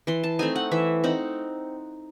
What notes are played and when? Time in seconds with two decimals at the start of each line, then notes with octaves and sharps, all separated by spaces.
0.07 E3 C6
0.24 A5
0.39 A3 C4 D#4 G#5
0.56 F#5
0.71 E3 E5
1.04 C4 D#4 F#5